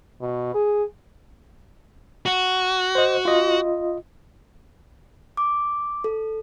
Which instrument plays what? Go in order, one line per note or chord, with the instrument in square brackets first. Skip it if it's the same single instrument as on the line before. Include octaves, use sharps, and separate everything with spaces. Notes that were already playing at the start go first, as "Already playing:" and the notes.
[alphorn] B2
G#4
[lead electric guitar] F#4
[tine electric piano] C5 D#5
F4 D#5
[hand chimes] D6
A4